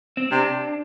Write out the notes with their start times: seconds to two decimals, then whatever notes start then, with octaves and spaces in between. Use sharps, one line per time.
0.17 C4
0.31 C3 D4